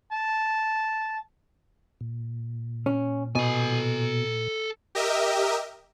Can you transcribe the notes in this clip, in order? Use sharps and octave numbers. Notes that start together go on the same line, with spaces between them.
A5
A#2
C#4
B2 A4 G#5
G4 A#4 D#5 E5